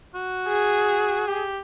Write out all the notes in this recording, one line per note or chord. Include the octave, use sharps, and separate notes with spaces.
F#4
G#4
G4